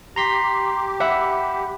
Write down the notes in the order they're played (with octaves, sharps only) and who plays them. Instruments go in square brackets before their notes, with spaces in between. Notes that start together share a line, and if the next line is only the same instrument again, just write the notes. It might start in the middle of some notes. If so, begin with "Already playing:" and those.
[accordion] G4 [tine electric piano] A#5 C6 B6
[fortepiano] E5 [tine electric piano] F#5 B5